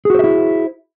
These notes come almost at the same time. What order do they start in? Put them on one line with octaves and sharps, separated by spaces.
G#4 F#4 C5 E5 E4